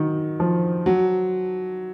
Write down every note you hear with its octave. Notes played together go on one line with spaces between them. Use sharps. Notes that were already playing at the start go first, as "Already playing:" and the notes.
Already playing: D#3 F#3
F3
F#3